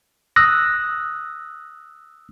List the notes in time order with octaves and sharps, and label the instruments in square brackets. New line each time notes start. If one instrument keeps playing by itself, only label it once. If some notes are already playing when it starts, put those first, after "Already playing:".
[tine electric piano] D#6 E6 F#6 A#6